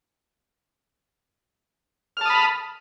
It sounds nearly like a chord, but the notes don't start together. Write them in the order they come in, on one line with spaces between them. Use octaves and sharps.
F6 A5 D#6 B5